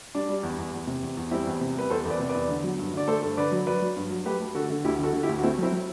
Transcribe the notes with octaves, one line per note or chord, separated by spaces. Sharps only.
G3 D4
G3
E2
E2
E2
C3
E2
E2
G3 C4 E4
E2
C3
G3 B4
E2 A4 C5
E2 B4 D5
C3
B4 D5
E2
D3
F#3
G2
D3 D5
A3 A4 C5
G2
D3 B4 D5
F#3
F#3 B4 D5
F#3
G2
F#3
A3 G4 B4
A3
D3 F#4 A4
D3
D2 E4 G4
D3 F#4 A4
D3
E4 G4
D2
F#4
A3 C4 E4
F#3 C4 E4
F#3